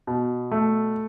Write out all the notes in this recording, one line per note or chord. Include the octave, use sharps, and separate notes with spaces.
B2
A3